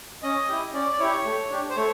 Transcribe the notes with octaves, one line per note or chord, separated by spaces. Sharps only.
C#4 D#5
E4 G4
C#4 D5
D5
E4 G4 C#5
A3
D4 G4
C5
A3 C#5